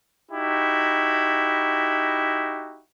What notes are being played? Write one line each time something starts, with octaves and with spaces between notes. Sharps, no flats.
D#4 E4 F#4 G4